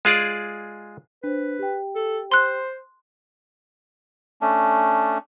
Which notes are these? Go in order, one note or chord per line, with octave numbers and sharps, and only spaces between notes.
G#3 F4 G#4 D5
D4 B4 C5
G4 G5
A4
C5 C6 F#6
A3 C#4 D4